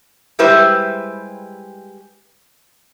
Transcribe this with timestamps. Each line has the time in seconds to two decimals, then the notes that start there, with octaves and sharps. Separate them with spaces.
0.39 G3 G#3 E4 G4 B4 C5